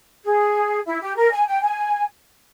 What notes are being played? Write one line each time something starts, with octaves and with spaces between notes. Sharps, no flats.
G#4
E4
G4
A#4
G#5
G5
G#5